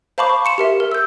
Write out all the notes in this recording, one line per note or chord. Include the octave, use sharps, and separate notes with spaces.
C5 F5 A5 B5 C#6 D6
C#6
C6 C#7 E7
G4 A#4 E5
A#4
E6 G6